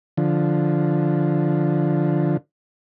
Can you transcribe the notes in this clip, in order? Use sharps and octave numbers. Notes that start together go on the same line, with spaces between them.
D3 F3